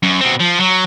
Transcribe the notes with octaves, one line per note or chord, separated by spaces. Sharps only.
F#2
B2 C4
F3
F#3